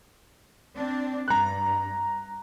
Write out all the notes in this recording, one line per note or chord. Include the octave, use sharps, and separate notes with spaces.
C4 D4
G2 A#5 F#6